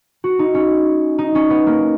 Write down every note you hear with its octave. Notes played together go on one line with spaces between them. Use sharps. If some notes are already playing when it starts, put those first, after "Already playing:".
F#4
D#4
C#4
D#4
C#4
B3
A#3